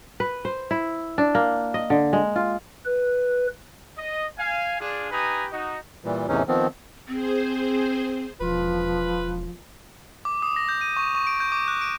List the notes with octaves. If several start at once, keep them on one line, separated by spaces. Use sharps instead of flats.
B4
C5
E4
D4
A#3
D#5
D3
G#3
F4
B4
D#5
F5 G#5
D4 F4 G#4
D#4 G4 B4 G#5 A#5 D#6
D#4 F#4 D#5
A#2 E3 G3
E2 A2 C3 E3 C#4 D#4
D#3 F3 B3 C4
C4 G#4 C5
E1 F3 F4 B4
D6
D#6
A#6
G6
D#7
C#6
C#6
D7
G6
D6
F#6
D7